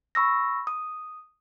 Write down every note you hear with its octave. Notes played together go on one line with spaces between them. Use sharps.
B5 C#6 E6 A#6
D#6